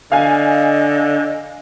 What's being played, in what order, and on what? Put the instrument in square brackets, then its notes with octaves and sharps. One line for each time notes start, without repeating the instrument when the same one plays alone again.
[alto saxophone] D3 [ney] D#5 [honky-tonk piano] F5 G#5